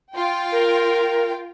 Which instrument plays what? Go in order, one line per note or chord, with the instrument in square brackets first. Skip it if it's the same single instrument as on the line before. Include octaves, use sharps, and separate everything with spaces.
[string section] F4 G5
[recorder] A#4